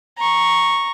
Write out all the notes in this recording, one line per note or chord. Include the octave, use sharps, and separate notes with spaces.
A#5 C#6